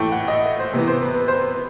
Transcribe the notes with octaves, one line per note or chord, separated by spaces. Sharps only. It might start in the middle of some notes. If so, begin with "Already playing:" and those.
Already playing: A2 E3 A3 G5
F#5
D#5
E5
C5
C3 E3 B3
C5
B4
B4
C5
B4